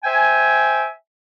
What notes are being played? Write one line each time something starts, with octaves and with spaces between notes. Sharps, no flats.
C5 E5 G5 G#5